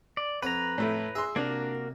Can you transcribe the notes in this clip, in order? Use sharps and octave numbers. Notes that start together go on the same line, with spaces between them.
D5
F2 B4 F#5 A#5 B5
A2 A3 E4
G#4 E5 C6
C2 A#3 D4 F#4 A#4